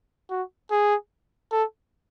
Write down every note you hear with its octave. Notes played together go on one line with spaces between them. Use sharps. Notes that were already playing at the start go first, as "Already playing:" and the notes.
F#4
G#4
A4